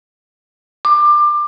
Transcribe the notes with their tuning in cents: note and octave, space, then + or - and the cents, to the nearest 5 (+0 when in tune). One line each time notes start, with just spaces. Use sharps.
D6 +25